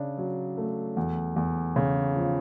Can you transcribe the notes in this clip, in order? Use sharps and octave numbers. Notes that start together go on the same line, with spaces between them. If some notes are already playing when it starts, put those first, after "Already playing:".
Already playing: C#3 D4
F#3
A3
E2
E2
C#3
F3